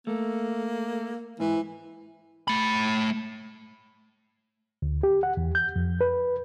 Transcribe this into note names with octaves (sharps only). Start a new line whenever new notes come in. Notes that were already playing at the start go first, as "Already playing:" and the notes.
A3 A#3
G#2 E3
A3 B5
D2
G4
F#5
E2
G6
F2
B4